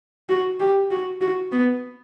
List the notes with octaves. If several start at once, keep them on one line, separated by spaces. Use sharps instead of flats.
F#4
G4
F#4
F#4
B3